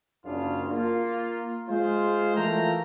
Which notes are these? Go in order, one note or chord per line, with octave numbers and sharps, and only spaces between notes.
F#1 F#2 C#3 D4 F4 F5
A#3 F4
G#3 F4 C5
E3 A3 A#3 F4 G5 A#5